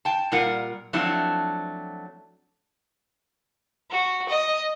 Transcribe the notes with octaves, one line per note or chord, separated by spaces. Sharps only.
G5 A5
A#2 G3 F4 A#4 F#5
F3 F#3 A3 C4 D4 E4
F#4
D#5